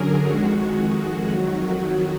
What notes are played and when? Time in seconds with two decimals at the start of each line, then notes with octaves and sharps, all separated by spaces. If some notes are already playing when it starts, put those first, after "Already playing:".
Already playing: F#2 D3 F#3 G#4 A#4
0.24 F2 D#3 G#3 F#4
1.31 F2 D#3 F#3 F#4
1.83 F#4